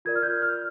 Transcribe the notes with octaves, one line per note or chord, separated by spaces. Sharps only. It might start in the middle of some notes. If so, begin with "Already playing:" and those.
F4 A#4 D5 G#6
F6
G6
F6